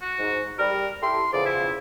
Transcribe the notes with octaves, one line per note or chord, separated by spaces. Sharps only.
F#4
G#2
G3 A#4
E4 G4 A4 C6
E2 C#3 F3 D5
E4